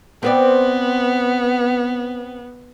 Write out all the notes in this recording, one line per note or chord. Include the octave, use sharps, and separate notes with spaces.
B3 C4 B4 D5